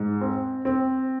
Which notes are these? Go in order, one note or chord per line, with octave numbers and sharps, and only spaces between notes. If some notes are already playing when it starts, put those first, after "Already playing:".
Already playing: G#2
C4
C4